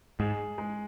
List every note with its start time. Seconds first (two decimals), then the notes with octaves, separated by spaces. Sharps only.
0.20 G#2 G#4
0.58 G#3